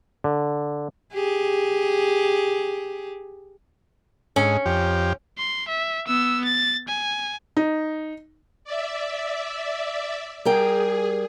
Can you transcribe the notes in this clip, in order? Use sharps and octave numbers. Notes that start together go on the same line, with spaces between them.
D3
G4 G#4
G#2 C#4
F2 G4
C6
E5
B3 E6
A6
G#5
D#4
D5 E5
G3 G#4 A#4 G5